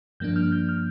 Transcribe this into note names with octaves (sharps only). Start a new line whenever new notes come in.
G2 F3 A#3 D4 G6
F6
G6
F6